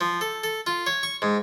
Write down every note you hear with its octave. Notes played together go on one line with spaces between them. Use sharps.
F3
A4
A4
F4
C#5
C#6
G#2